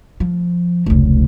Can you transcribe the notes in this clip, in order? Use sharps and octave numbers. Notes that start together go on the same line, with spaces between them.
F3
F1 C#2